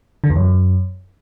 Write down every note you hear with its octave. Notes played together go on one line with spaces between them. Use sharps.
D3
E2
F#2